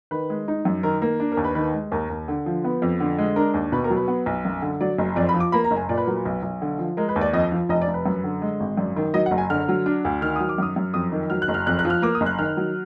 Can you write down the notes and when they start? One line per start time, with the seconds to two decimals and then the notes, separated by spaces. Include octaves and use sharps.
0.11 D#3 B4
0.30 G#3
0.48 D#4
0.65 F#2
0.83 D#3 A#4
1.02 A#3
1.20 D4
1.32 A#4
1.37 D#2
1.44 B4
1.55 D#3 B4
1.74 G#3
1.92 D#2 A#4
2.09 D#2
2.28 D3
2.46 F3
2.64 B3 B4
2.82 F2
3.00 D3
3.18 G#3
3.36 D4 A#4
3.54 D#2
3.72 B2 B4
3.84 A#4
3.90 F#3
3.96 B4
4.08 B3
4.26 B1
4.45 F#2
4.62 D3
4.81 F#3 D5
4.98 F#1
5.16 F2 D5
5.29 B5
5.34 F3
5.40 D6
5.52 A#3 B5
5.64 A#5
5.71 F#1
5.77 G#5
5.89 A#2 D5
5.97 B4
6.07 F#3 A#4
6.16 B4
6.26 B1
6.43 B1
6.62 D3
6.79 F3
6.97 G#3 A#4
7.09 B4
7.16 D#2
7.21 D5
7.33 F2 D#5
7.52 F3
7.69 F1 D#5
7.82 D5
7.88 F1
7.94 B4
8.06 F#2
8.24 D3
8.42 G#3
8.60 G#1
8.77 F#2 D5
8.96 D#3
9.14 F#3 D#5
9.26 F#5
9.31 F#1
9.38 G#5
9.50 D3 F6
9.68 F#3
9.86 D4
10.05 D2
10.22 D#3 F6
10.36 F#3 D#6
10.49 D6
10.58 F#2 D#6
10.76 F#2
10.94 F2 D#6
11.12 D#3
11.30 F#3 F6
11.42 F#6
11.48 F#1
11.54 F6
11.67 F2 F#6
11.79 F#6
11.85 F3
11.90 F6
12.02 A#3 D6
12.15 D#6
12.21 F#1
12.26 F#6
12.39 D#3 F6
12.57 F#3